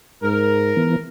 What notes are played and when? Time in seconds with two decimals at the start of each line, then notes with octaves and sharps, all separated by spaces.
0.23 G#2 A#4
0.76 E3 B3